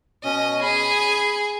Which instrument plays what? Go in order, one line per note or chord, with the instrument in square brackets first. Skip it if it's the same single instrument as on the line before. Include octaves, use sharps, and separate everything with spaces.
[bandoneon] B2 C#4 [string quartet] D#5
[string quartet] G#4 [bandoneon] B5